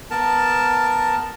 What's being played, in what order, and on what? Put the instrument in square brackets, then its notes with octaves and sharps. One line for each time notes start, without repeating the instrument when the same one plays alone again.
[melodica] B3 A#4 A5